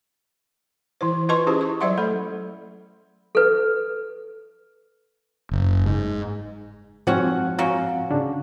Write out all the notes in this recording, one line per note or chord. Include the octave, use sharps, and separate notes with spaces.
E3 E4 C5
F4 B4 D#5 A5 C6 C#6
C#4 E4 G4 G#4 C5 D#5
C#6
F#3 C5 D5 E5 F#5 C6
A3 A4 B5
A4 B4
F#1
G#2
G#2 F3 C4 C#4 F#4 F#5
A#3 C#4 F#4
C#3 D4